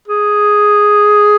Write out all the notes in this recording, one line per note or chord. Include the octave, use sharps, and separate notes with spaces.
G#4